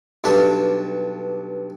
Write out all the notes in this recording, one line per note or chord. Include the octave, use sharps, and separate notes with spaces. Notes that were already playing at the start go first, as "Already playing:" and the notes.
B1 G2 D4 A4 E5